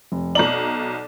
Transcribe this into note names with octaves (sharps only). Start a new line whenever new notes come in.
F1
B1 D5 A#5 F#7